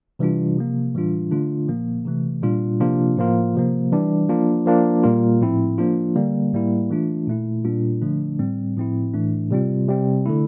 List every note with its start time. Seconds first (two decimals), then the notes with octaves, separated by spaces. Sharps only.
0.19 C3 E3 G3 D4 F4
0.56 C3 F3 A#3
0.94 A2 E3 G3 D4 F4
1.31 D3 A3 D4 F4
1.68 A#2 F3 A#3
2.05 C3 E3 A3
2.42 A#2 G3 D4 F4
2.80 C3 F3 A#3 D4 F4
3.17 A2 F3 A#3 F4
3.55 C3 F3 A#3
3.92 E3 G3 D4
4.29 F3 A#3 D4 F4
4.66 F3 A#3 D4 F4
5.03 A#2 G3 A#3 F4
5.41 A2 F3 C4 E4
5.78 F3 A#3 D4 F4
6.15 D3 G3 A#3
6.53 A2 G3 A#3 E4
6.90 E3 A3 D4 F4
7.27 A#2 A3 E4
7.65 A#2 G3 D4 F4
8.02 D3 F3 A3 D4
8.39 A2 G3 C4
8.76 A2 F3 C4 E4
9.14 A2 E3 A3 D4
9.51 C3 G3 C4 F4
9.88 C3 G3 C4
10.26 D3 A3 E4